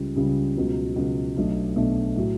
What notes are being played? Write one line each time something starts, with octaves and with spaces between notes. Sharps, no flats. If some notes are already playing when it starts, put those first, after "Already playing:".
Already playing: C#2 C#3 G3
C#2 C#3 G3
C#2 B2 F#3
C#2 B2 F#3
B1 B2 A3 D4
B1 B2 A3 D4
A2 F#3 A3